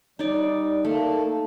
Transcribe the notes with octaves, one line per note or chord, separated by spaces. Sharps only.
G3 D#4 D5
A3 A#3 A4